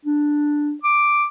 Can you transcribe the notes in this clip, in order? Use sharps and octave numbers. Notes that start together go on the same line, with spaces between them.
D4
D6